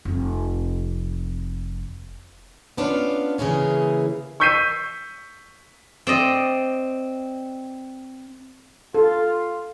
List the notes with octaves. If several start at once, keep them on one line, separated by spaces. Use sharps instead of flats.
F1 F2
B3 C#4 D4 F4 B4 F5
C#3 E3 A#3 C#4 G#4
C#6 E6 G6 B6 C7 D#7
C4 D5 D#5
F4 A4